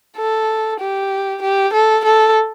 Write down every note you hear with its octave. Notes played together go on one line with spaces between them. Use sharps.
A4
G4
G4
A4
A4